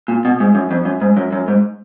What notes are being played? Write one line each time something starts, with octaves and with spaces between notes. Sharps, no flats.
A#2
B2
G#2
F#2
F2
F#2
G#2
F#2
F#2
G#2